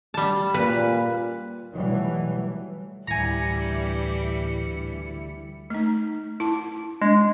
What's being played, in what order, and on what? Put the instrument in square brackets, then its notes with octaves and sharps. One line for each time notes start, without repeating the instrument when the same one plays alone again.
[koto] G3 A5
[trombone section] A#2 [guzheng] B4
[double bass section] B2 E3 F#3 G3 A3
[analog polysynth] D2 E4 C#7 [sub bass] A2 [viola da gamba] E3 G3 [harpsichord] G#5 A#5
[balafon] A3 D#4
E4 A5 D6
[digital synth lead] G#3 [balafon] D4